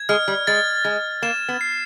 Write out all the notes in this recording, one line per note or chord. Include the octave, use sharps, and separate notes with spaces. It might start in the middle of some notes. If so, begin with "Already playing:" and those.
Already playing: G#6
G#3 F6
G3
G#3 A6
G#3 A6
A#3 E7
B3
C7